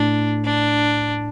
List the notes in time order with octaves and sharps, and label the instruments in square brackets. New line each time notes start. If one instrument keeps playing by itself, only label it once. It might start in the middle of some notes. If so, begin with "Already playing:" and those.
Already playing: [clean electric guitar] A2 [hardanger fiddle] D4
[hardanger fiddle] D4